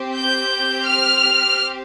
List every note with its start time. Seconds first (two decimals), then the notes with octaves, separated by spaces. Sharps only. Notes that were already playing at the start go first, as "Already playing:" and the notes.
Already playing: C4 G4
0.15 G6
0.87 F6